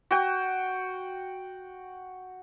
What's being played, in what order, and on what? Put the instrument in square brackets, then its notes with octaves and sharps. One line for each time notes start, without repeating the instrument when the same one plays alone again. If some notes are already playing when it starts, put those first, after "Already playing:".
[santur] F#4 G5